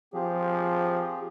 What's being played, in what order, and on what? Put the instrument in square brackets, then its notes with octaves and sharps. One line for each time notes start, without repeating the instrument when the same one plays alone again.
[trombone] F3 [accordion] C4 G4 G#4